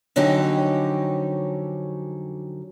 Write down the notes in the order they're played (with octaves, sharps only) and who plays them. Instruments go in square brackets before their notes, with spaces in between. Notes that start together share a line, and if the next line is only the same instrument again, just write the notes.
[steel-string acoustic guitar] F2 D3 F#3 C#4 D#4 G4